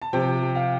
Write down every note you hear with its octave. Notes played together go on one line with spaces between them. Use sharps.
A5
C3 F3 C4 G5
F5